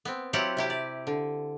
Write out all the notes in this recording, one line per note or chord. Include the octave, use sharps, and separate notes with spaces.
B3 C4
F#3 C4 E4 F4 G4 F#5
C3 E4 G4
D5
D3